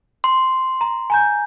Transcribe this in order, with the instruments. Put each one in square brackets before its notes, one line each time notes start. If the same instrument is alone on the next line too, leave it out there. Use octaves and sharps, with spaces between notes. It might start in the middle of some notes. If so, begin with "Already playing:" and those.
[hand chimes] C6
[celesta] A#5
G#5 A#5 G6